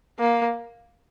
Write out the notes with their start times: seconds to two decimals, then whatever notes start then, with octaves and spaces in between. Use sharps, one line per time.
0.19 A#3